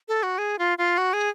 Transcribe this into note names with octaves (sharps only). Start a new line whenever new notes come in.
A4
F#4
G#4
F4
F4
F#4
G#4